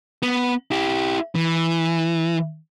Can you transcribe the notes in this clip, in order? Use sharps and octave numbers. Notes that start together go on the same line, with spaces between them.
B3
E4 G4
E3